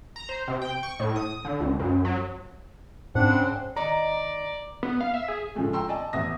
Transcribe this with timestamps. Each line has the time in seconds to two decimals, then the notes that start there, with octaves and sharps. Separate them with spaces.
0.16 A#5
0.29 C5
0.48 C3
0.62 G5
0.83 C#6
1.00 A2
1.16 D#6
1.45 D3
1.60 C#2
1.79 F#2
2.05 F#3
3.15 G#2 C#3 C4 D4 F#5
3.76 G#2 D#3 D5 D#5 A#5
4.83 B3
5.01 F5
5.14 E5
5.28 G#4
5.55 A2 C#3 F3 G#3 A3
5.73 G5 A#5 C6 C#6 E6
5.89 D5 D#5 G#5 A5
6.13 A1 E2 B3 E5 D#6 A#6